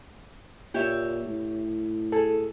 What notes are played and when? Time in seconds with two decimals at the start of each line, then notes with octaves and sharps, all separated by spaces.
0.74 A#2 G4 C#5 E5
1.26 A2
2.12 G#4 A4